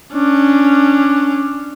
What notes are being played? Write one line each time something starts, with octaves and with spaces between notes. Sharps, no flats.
C#4 D4